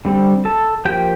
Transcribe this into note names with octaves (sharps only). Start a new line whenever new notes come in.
D3 G3 C4
A4 A5
F3 A#3 G4 G5